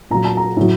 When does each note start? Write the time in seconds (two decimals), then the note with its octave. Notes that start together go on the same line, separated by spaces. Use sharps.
0.11 A#2 F#3 A#5
0.25 A5
0.37 A#5
0.57 A2 F#3